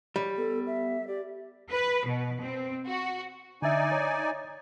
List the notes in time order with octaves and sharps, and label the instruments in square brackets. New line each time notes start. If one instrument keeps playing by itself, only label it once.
[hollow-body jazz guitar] G3 [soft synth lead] C#5
[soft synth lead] B3 [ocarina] A4
[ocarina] E5
[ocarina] G4 [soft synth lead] D5
[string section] B4
B2
C4
F#4
[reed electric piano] D3 E5 [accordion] D#4 D5 G#5
[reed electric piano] C#5